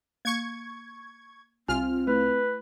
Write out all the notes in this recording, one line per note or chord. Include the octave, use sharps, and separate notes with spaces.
A#3 C#6 G#6
C2 C4 F4 G#5 F6
A3 E4 B4